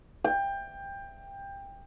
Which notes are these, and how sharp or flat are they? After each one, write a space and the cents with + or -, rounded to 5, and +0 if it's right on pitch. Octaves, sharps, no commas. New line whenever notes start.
G5 +20